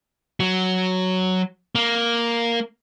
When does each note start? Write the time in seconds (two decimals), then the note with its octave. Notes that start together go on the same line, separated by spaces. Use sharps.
0.40 F#3
1.75 A#3